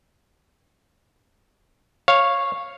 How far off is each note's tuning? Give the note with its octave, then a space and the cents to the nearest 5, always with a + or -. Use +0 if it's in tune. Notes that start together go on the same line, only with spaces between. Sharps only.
C#5 -10 F5 +0